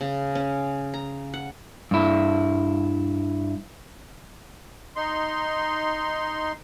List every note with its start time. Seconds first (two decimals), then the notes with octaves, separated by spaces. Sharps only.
0.01 C#3
0.35 C#4
0.94 A#5
1.34 F#5
1.91 G2 E4
4.96 D#4 C6